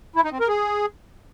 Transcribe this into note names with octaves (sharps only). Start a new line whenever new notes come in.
E4
D#4
C4
A#4
G#4